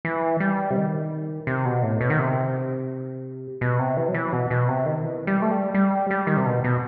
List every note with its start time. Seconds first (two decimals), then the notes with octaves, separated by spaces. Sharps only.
0.05 E3
0.40 G3
0.71 C3
0.76 D#3
1.47 C3
1.65 B2
1.83 A2
2.01 B2
2.10 D#3
2.19 C3
3.61 B2
3.79 C3
3.97 E3
4.08 F#3
4.14 E3
4.33 B2
4.50 B2
4.68 C3
4.86 D#3
5.04 E3
5.27 G3
5.42 A3
5.51 G3
5.74 G3
6.10 G3
6.27 D#3
6.37 C3
6.46 B2
6.64 B2